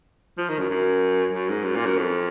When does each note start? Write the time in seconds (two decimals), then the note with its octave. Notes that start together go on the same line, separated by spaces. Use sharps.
0.38 F3
0.49 D#3
0.59 F#2
0.70 F#2
1.33 F#2
1.49 G#2
1.64 F#2
1.75 A#2
1.86 F#2
1.97 F2